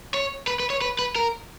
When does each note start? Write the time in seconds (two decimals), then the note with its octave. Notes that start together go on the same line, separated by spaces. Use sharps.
0.14 C#5
0.47 B4
0.60 B4
0.70 C#5
0.81 B4
0.99 B4
1.16 A#4